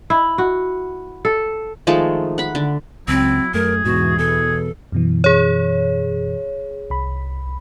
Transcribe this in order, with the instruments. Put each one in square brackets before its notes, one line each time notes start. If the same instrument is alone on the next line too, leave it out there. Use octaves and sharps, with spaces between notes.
[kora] E4
F#4
A4
[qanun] D#3 F3 G#3 A3
F#5 B5
D3
[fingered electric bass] C#2 [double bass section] F#3 [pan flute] C4 [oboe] E4
[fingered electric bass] F#2 A3 [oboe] G#4 [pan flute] A#4
[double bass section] E2 E3 [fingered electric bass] G#2 B2 [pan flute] F#4
[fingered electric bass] B2 [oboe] G#4 [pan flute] A4
[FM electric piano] F#2 B2 E3
[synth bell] G#4 C#5
[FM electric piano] C2 B5